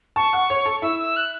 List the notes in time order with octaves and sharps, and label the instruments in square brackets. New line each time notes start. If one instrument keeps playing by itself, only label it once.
[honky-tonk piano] A5 [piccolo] C#6
[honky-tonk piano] F#5
C#5
A4
[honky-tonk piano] E4 [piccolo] E6
[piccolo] E6
F#6